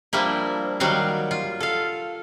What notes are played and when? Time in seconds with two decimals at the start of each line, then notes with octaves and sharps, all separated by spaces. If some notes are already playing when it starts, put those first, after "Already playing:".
0.13 F3 G3 A#3 D4 E4
0.80 D#3 F#3 G3 F#4 F5
1.31 F4
1.60 A4 F5